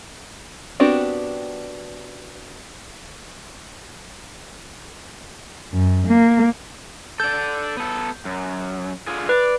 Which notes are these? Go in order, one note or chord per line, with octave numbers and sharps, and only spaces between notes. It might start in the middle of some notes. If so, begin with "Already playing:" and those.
B3 C4 D4 F#4 G4
F#2
A#3
A4 D5 G6
B3 A4
F#2
D3 F4 G#4
B4 D5